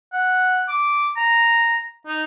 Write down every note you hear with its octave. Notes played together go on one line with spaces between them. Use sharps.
F#5
D6
A#5
D#4